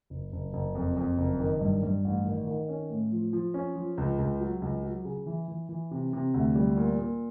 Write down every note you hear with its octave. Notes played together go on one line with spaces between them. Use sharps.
F#1
F#1
F#1
F2
F2
F#1
D#3
G2
G2
A1
D#3
D#3
C#4
A2
F3
F3
C#4
F3
C#2
C#2
F#3
C#2
F#3
C#3
E3
E3
E3
C3
C3
D2
G3
A#2
A#2